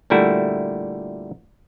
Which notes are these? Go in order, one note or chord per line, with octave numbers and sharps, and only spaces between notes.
A#2 D3 G3 A3 E4 F#4